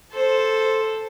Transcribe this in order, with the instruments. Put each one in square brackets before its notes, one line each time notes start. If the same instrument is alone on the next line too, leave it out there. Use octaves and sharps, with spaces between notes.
[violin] A4 C5